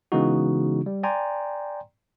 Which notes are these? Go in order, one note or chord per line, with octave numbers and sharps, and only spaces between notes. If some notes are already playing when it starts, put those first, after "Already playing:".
C#3 E3 G#3 B3 D#4 F#4
G3
D5 G5 G#5 A#5 C6